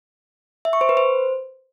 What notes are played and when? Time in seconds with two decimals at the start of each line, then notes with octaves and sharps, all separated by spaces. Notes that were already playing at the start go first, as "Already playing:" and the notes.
0.65 E5
0.73 C#6
0.81 C5
0.89 B4
0.97 C5